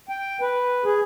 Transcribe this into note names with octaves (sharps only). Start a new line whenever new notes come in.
G5
B4
G#4